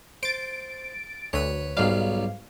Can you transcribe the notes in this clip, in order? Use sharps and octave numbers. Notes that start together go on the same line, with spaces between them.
C5 A6 D7
D2 B4 C#5
B1 G#2 F#3 G3 F5